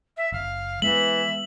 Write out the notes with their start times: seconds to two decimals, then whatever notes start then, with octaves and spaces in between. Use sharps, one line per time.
0.16 E5
0.32 F#1 F5
0.82 E3 G#3 B3 E5 F#7